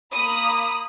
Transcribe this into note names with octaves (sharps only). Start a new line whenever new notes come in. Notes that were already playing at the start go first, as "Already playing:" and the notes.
A#3 B5 D#6